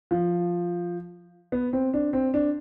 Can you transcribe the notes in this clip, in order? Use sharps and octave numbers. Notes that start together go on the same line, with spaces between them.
F3
B3
C4
D4
C4
D4